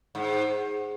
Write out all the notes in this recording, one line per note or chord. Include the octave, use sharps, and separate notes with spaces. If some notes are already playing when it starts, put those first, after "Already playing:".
G#2